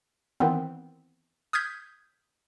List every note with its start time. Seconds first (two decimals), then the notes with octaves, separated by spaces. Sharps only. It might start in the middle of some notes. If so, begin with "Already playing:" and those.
0.40 D#3 E3 B3 C4
1.53 D#6 F6 G6 G#6 B6